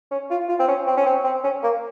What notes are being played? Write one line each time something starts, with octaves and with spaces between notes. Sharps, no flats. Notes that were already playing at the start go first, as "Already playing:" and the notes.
C#4
F4
F4
C4
C#4
C4
C#4
C4
C4
C#4
A#3